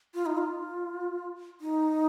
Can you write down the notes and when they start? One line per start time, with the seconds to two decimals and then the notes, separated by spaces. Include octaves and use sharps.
0.14 F4
0.26 D#4
0.37 F4
1.61 D#4